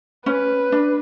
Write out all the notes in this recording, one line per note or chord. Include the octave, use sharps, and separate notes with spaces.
C#4 B4
D4